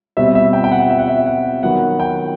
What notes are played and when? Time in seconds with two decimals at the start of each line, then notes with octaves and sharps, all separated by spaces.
0.17 B2 G3 C4 E5
0.35 E5
0.53 G5
0.64 G5
0.72 F#5
0.90 E5
0.99 F#5
1.08 E5
1.26 F#5
1.63 D#3 F#3 B3 F#5
2.00 G5